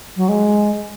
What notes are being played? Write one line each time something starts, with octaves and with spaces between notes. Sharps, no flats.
F#3
G#3